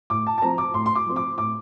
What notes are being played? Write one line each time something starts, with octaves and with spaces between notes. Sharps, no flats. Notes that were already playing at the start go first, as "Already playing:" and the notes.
A2 D6
A5
A5
F3 C4 A#5
D6
A2 C6
C6
D6
F3 C4
D6
A2 D6